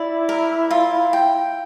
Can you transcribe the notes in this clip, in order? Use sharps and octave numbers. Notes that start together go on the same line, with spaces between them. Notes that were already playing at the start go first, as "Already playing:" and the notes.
Already playing: E4 D5
A#4
F4
G5